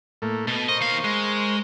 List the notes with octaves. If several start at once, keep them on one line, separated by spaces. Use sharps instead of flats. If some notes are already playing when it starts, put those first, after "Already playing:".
A2 A3 A#3
B2 A5
A#4 C5 D#5 C#6
D#2 F5
G#3